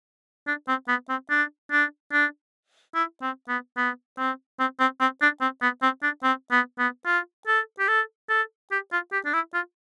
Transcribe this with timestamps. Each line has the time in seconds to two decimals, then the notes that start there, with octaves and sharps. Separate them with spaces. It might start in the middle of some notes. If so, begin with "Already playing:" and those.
0.47 D4
0.68 C4
0.88 B3
1.09 C4
1.30 D4
1.71 D4
2.13 D4
2.95 E4
3.22 C4
3.49 B3
3.77 B3
4.18 C4
4.60 C4
4.80 C4
5.01 C4
5.22 D4
5.41 C4
5.62 B3
5.83 C4
6.03 D4
6.23 C4
6.52 B3
6.79 B3
7.06 F4
7.47 A4
7.79 G4
7.88 A4
8.29 A4
8.72 G4
8.92 F4
9.12 G4
9.26 D4
9.34 E4
9.54 F4